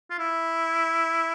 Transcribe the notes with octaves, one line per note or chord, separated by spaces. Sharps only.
F4
E4